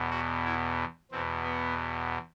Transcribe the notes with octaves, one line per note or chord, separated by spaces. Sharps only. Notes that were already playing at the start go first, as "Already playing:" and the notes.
Already playing: E2 B2
F#4
E4
E2 B2 C4
B3